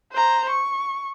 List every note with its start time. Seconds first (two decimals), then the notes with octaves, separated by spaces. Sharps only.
0.12 C5 A#5
0.49 C#6